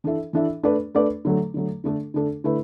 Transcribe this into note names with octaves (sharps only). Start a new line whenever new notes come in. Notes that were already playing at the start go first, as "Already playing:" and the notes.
E3 D4 A4 E5
E3 D4 A4 E5
A3 D4 B4 D5
A3 D4 B4 D5
D3 F#3 A3
D3 F#3 A3
D3 A3 D4 A4
D3 A3 D4 A4
D3 A3 E4 B4 E5